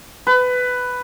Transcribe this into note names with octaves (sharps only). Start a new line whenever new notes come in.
B4